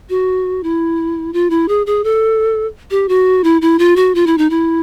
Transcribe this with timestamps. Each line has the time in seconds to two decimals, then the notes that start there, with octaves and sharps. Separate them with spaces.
0.10 F#4
0.63 E4
1.33 F4
1.50 E4
1.68 G#4
1.86 G#4
2.04 A4
2.91 G4
3.09 F#4
3.44 E4
3.62 E4
3.79 F4
3.96 F#4
4.15 F4
4.27 E4
4.38 D#4
4.50 E4